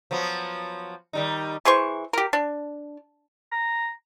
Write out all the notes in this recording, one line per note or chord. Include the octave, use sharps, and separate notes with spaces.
F3 F#3 B3
D#3 G3 D#4
E3 G#4 C5 C#6
G4 A#4
D4
A#5